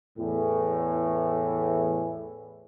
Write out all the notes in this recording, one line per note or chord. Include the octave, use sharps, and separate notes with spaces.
E2 A2 E3